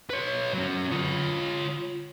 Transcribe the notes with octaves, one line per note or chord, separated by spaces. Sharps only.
B4 C#5
F#3 C#4
F4 C#5